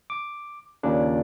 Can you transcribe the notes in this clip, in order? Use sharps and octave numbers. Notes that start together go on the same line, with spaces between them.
D6
D#2 A#2 C#3 D4